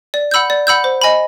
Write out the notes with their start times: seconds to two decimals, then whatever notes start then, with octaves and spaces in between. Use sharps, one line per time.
0.14 D5
0.31 F#5 B5 E6 G6
0.50 D5
0.67 F#5 B5 E6 G6
0.84 C5
1.01 D#5 G#5 B5